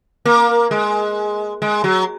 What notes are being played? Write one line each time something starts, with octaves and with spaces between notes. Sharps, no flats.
A#3
G#3
G#3
F#3